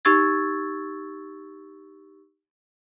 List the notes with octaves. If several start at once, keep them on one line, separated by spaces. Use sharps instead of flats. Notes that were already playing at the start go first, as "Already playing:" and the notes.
D#4 G4 C#6 E6 G#6 A6